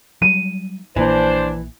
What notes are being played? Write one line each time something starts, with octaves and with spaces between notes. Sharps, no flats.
F#3 G3 D#7
A#1 A#2 E3 A#3 D4 C5